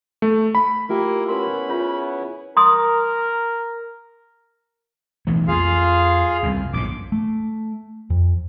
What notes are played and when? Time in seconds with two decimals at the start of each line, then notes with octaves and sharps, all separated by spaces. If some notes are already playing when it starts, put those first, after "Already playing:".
0.22 A3
0.55 B5
0.89 A3 A#3 E4 F4 G4 A#4
1.28 B3 C#4 E4 A#4 B5 C6
1.69 F4 G#4 C#5
2.57 A#4 C6 D#6
5.27 B1 E3 A3
5.48 F2 F4 G#4 F5
6.43 C2 F#2
6.73 A#1 F#2 A2 D6
7.12 A3
8.10 F2